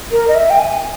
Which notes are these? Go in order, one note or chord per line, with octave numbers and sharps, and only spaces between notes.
A#4
D#5
E5
G5
G#5